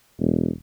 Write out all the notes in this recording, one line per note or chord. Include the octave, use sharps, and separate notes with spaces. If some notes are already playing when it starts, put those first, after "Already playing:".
E1